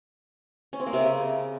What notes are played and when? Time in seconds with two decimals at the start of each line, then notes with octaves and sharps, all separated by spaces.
0.73 C#4
0.80 C4
0.86 A#3
0.93 C3
1.00 C#3